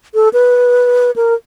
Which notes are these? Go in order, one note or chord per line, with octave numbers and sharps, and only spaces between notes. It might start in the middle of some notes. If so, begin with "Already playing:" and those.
A4
B4
A#4